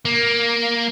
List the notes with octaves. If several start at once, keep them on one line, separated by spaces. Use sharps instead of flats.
A#3